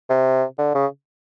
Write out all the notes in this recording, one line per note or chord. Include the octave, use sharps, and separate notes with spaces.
C3
D3
C#3